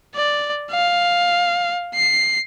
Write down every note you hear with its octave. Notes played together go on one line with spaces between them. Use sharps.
D5
F5
C7